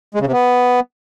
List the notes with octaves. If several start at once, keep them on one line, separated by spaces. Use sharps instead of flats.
G#3
C#3
C3
B3